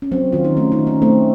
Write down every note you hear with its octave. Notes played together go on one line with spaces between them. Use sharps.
C#4
F#3 C4
D#3 F4
D#4
A3 C#4
D#4
D#3
C#4
A3 C4